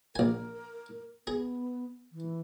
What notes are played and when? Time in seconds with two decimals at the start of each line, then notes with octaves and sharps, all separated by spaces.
0.16 A#1 A#4 G#5
1.27 B3 G#4
2.13 E3